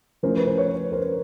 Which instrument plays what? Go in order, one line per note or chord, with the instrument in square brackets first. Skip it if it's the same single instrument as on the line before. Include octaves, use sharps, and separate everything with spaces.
[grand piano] F3 A3 C#4 E4 A#4 C5
B4
C5
B4 C#5
A#4 C5